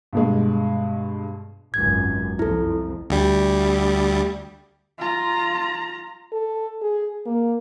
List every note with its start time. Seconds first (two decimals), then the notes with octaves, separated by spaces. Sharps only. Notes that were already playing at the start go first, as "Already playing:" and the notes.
0.13 G2 B2 G#3
1.74 G#1 C#2 F#2 G#6
2.39 C2 F2 E4 A4
3.10 D2 G3
4.98 F4 A#5
6.32 A4
6.82 G#4
7.26 A#3